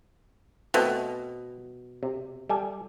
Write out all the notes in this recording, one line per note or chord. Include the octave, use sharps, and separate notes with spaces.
B2 A3 C4
C3
G3 A4 G#5